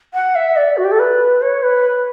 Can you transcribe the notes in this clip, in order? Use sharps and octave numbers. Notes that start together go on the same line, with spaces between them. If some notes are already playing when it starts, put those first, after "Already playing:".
F#5
E5
D5
F#4
G4
A4
B4
C#5
B4